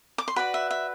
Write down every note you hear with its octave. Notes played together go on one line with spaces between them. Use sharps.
D6
C6
F#4 B4 D5 B5
E5
E5